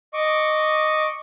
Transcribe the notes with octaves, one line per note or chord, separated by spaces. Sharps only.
D#5 C#6 D6